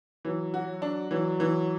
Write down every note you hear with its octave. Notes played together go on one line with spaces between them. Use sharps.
E3 F#3
F#4
F#3
D4
E3 F#3
E3